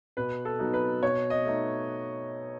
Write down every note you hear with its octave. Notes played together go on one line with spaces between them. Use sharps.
B2 B4
A4
F#3 B3 D#4
B4
B2 C#5
D#5
A3 D#4